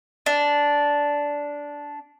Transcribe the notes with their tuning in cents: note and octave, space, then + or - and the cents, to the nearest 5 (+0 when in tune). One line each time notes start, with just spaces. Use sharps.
D4 -10